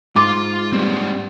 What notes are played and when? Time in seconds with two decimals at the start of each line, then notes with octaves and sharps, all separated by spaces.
0.16 G#2 F4 C6 D6
0.72 G3 A#3 C4